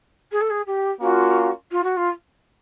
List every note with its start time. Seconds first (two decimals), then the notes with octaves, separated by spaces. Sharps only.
0.31 G#4
0.41 A4
0.50 G#4
0.66 G4
1.01 A#3 C#4 F4 F#4
1.71 F4
1.83 F#4
1.96 F4